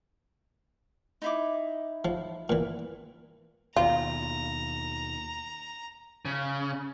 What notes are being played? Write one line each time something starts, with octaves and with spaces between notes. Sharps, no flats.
D#4 E4 D6
F3
A#2 E3
D#2 B2 F4 A#5
C#3